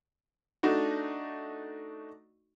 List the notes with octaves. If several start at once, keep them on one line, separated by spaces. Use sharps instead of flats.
A3 D4 D#4 F#4